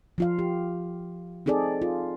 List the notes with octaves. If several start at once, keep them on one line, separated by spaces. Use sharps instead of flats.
F3 F4 F5
G4
C4 D#4 G#4 A4 D5
F4